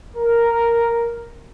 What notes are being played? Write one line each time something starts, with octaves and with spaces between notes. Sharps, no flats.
A#4